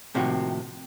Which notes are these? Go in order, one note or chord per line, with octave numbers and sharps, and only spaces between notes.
A2 C3 D#3 F3 A#3 F#4